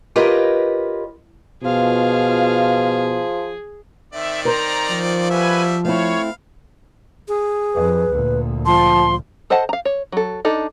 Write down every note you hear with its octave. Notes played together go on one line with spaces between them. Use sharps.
F4 G4 A#4 B4 C#5 D#5
B2 F3 F4 G#4 F5
D#3 C4 D5 E5
A#4 C5 A#5
F3
G3 F#4 B4 E5 G#5
A3 C4 E4 C#5 F5
G#4
F2 B4
D2 A#2
F3 A5 C6
A4 C5 D#5 F#5 A5
F5 A#5
C#5
F#3 A4
D4 D#4 A4